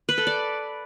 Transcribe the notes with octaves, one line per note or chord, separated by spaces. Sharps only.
B4
A4
D5